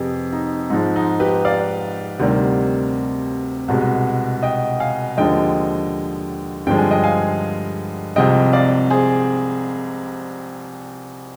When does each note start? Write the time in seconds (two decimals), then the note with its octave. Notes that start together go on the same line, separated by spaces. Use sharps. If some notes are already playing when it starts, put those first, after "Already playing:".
Already playing: F2 C3 G4 G#4 B4
0.33 D#4
0.70 G#2 D#4
0.73 F3 G#3
0.96 D#4
1.20 G4 B4
1.45 D5 F5
2.19 D2 C3 D#3 G3
3.68 C2 B2 G#3
4.43 D#5 G5
4.80 F5 G#5
5.17 D#2 D3 F3 G#3 D#5 G5
6.67 G2 D3 F3 G#3 G5
6.78 G#5
6.91 D#5 G5
7.04 F5 G#5
8.16 C2 C3 F3 G#3 D#5 G5
8.53 D5 F5
8.90 G#4 C5